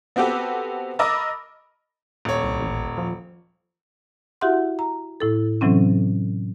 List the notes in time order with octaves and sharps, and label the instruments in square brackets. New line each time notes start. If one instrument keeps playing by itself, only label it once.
[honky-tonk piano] B3 C4 F#4 G4 A4 B4
A#4 D#5 B5 D6 E6 A6
[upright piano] D#1 C#5
[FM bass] C2
A1
F3
[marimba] E4 F#4 G4 E5 F#5 C6
A#5
A2 E4 A4
A2 C3 E3 F#3 C4 C#4